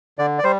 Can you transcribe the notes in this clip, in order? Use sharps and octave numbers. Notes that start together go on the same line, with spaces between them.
D3 D5
D5
G3 C5